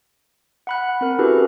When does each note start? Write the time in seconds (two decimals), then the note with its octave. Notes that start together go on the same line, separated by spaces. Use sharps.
0.67 F#5 B5 F#6
1.01 C4 A#4
1.19 C#4 E4 F#4 G4 A4 B4